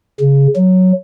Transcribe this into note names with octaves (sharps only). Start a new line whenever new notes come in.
C#3
F#3